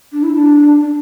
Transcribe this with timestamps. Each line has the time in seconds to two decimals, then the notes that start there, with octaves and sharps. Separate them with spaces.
0.12 D4
0.23 E4
0.34 D4
0.80 D4